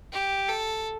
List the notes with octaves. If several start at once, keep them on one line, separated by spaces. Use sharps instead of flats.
G4
A4